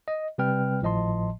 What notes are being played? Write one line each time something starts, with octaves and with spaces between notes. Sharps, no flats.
D#5
C3 G3 C4 B4 G5 F6
G#1 A2 F3 D#5 A5 C6